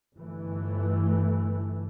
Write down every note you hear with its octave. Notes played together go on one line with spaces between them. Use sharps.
G1 E3 A3